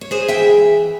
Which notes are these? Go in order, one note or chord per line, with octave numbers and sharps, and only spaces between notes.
C#5
G#3 G#4 C5
E5 G5
E3